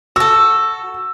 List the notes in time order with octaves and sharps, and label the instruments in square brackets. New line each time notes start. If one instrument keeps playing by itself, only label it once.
[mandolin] F#4 A4 [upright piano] E6